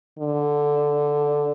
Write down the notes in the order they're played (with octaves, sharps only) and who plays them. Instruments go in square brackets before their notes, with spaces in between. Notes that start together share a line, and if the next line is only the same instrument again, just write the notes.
[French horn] D3